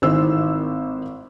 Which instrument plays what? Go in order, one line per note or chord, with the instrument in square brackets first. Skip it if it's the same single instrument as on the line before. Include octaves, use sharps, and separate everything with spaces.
[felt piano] G#1 A2 D#3 C5 E6